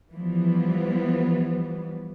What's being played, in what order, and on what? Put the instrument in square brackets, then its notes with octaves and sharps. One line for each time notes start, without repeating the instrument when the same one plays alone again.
[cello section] E3 F3 G3 B3